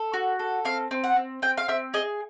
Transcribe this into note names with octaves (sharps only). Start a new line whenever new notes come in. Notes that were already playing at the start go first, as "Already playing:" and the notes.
Already playing: A4
F#4
A4
C4 F5
C4
F#5
C4
C4 G5
F5
C4 E5
G#4 D#5